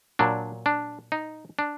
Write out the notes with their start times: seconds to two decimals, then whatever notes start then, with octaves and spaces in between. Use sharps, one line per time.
0.19 A#2 F#3 D4
0.66 D4
1.12 D#4
1.59 D4